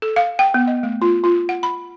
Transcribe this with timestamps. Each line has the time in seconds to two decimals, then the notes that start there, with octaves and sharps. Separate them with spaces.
0.02 A4
0.16 F5
0.39 G5
0.54 B3
0.67 D#5
0.83 A3
1.02 F4
1.24 F4
1.49 F#5
1.63 B5